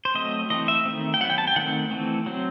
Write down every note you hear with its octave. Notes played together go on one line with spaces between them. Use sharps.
C5
F#3 A3 C4 D#5
E3 A3 C4 D#5
E5
D#3 A3 C4
G5
F#3 B3 F#5
G5
A5
G5
D#3 A3 C4 F#5
E3 A3 C4
F#3 C4